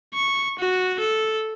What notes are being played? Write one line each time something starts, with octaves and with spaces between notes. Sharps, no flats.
C#6
F#4
A4